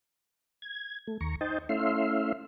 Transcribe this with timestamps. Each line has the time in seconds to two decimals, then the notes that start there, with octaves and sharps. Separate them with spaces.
0.62 G#6
1.07 A3
1.21 D#2 A#5 C#6
1.41 D#4 C5 D#5 G5 A5
1.69 A3 C#4 E4 E5 F5 C6